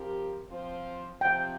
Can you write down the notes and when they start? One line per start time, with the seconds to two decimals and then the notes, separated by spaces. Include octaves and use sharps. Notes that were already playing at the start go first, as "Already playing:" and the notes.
Already playing: F3 C4 G4 A#4
0.50 F3 C4 F4 C5
1.21 C3 F3 C4 G5